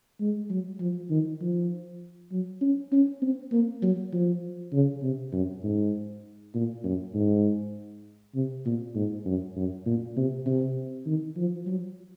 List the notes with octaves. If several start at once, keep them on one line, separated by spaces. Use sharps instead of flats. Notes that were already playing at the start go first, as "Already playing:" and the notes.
G#3
F#3
F3
D#3
F3
F#3
C#4
C#4
C4
A#3
F#3
F3
C#3
C3
F#2
G#2
A#2
F#2
G#2
C3
A#2
G#2
F#2
F#2
A#2
C3
C3
D#3
F3
F#3